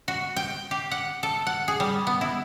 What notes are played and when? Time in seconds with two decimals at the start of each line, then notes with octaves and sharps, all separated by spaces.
0.08 F#4
0.36 G5
0.71 G4
0.91 F#5
1.23 A4
1.47 F#5
1.68 G#4
1.80 G3
2.07 B3
2.21 E4